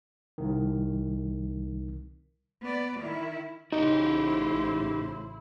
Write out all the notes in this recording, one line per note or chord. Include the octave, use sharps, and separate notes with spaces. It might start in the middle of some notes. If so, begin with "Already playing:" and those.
C2 D#3
B3 D5
D#3 E4
A1 A2 C#3 D#4 E4 F#4 G4 C5